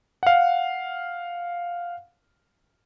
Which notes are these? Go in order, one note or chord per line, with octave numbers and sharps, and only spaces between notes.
F5 F#5